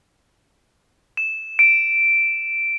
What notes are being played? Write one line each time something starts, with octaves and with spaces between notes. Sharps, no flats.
E7
D7